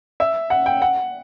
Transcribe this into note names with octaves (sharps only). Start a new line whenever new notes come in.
E5
F#5
G5
F#5